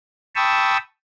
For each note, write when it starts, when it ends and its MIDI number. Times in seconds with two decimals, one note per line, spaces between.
0.36 0.77 79
0.36 0.77 81
0.36 0.77 83
0.36 0.77 85
0.36 0.77 87
0.36 0.77 88